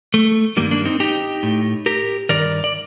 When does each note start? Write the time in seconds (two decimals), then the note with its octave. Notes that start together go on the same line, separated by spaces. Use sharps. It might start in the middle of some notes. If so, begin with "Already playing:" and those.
0.14 A3
0.57 G2 D#3 G3 A#3
0.71 A#3 D4
0.85 C4 D#4
1.00 D#4 G4
1.43 A2
1.86 G4 A#4
2.29 G2 D#3 A#4 D5
2.64 D5